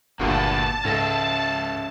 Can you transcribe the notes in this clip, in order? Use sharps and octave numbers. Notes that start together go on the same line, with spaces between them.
G1 D2 G2 A#2 A#3 B4 A5
C#2 G#2 C#4 A4 E5 A#6